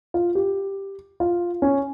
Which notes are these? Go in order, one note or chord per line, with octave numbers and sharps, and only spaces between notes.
F4
G4
F4
C#4